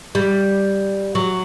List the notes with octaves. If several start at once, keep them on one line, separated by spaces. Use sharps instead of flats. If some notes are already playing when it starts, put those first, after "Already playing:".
G3
F#3